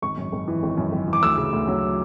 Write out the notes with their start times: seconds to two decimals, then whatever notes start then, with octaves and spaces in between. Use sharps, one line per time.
0.02 G#1 C#6
0.18 F#2
0.32 G#1
0.48 E3
0.63 G#1
0.78 F#2
0.92 G#1
1.08 E3
1.13 D6
1.22 D2 E6
1.38 C#3
1.53 D2
1.68 F#3